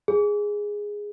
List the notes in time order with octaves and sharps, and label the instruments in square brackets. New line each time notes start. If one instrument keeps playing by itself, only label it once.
[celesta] G#4